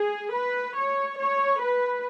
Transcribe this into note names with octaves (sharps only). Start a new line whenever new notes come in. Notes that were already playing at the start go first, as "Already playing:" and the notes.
Already playing: G#4
B4
C#5
C#5
B4